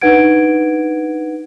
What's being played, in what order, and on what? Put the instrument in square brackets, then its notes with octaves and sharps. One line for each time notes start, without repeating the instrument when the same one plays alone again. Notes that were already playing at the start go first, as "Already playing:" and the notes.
[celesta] D4 D#4 B4 F#5 G#6 D7